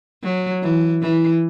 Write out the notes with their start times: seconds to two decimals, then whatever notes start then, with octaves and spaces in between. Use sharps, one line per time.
0.23 F#3
0.63 E3
1.02 E3